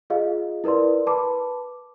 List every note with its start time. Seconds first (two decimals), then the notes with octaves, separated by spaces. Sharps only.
0.10 F4 G#4 D#5 F5
0.64 E4 A#4 B4 D5 C6
1.07 B4 A5 B5 D6